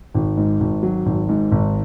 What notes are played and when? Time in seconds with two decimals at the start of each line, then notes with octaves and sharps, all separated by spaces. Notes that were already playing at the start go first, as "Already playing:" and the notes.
0.15 G#1
0.37 G#2
0.60 G#1
0.83 F#3
1.06 G#1
1.29 G#2
1.52 G#1